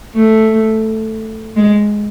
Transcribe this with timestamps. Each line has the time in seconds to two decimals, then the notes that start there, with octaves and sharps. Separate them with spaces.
0.14 A3
1.56 G#3